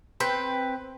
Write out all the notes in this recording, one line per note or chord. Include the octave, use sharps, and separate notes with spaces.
C4 B4 G5